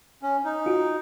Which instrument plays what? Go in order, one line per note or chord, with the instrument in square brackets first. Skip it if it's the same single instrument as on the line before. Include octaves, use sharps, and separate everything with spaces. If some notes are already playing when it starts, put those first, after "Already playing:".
[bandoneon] C#4
D#4
[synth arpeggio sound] F4 F#4